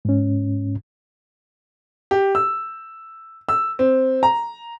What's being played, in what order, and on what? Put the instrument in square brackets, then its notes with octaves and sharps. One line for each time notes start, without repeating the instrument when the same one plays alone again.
[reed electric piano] G#2 C#4
[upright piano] G4
E6
E6
C4
A#5